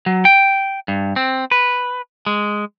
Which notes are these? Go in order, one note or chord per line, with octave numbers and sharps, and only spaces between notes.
F#3
G5
G2
C4
B4
G#3